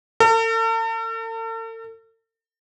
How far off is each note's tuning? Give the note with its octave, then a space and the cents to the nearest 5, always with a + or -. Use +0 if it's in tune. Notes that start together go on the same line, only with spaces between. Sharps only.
A4 +45